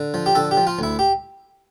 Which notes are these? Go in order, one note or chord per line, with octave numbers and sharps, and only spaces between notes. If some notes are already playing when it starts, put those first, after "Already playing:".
Already playing: D3
F3
G4
D3 A4
G4
F3
F4
D2 E4
G4